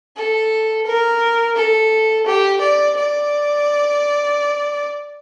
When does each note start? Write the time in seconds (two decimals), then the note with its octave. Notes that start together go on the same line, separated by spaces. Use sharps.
0.17 A4
0.86 A#4
1.56 A4
2.26 G4
2.61 D5
2.97 D5